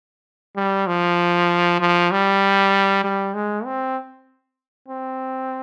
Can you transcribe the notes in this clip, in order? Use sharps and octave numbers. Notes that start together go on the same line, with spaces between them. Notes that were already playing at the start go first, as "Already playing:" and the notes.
G3
F3
F3
G3
G3
G#3
C4
C4